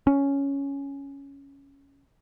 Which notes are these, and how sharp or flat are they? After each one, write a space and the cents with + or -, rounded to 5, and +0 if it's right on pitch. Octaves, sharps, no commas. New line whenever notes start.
C#4 +5